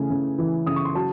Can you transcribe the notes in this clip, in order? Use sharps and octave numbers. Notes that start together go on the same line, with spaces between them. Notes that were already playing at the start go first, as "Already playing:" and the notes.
Already playing: C#3 E3 A3 G#5
C#3
E3
C#3 D#6
C#6
C6
F#3 A5